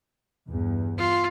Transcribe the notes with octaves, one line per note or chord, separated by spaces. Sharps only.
E2 G2
F4